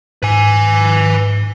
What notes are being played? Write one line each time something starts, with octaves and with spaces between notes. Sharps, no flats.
G#2 B4 G#5